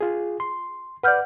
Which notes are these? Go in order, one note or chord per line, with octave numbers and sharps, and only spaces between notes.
F4 G#4
C6
B4 D5 F#5 F6 G6